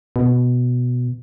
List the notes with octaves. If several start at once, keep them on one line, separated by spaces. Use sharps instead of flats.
B2